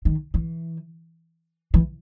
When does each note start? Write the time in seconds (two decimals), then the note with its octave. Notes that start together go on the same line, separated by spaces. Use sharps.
0.05 D#3
0.34 E3
1.74 E3